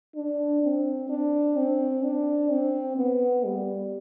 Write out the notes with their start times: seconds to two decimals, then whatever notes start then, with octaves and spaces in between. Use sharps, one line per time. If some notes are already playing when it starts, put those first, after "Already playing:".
0.16 D4
0.63 C4
1.09 D4
1.57 C4
2.04 D4
2.51 C4
2.97 B3
3.44 G3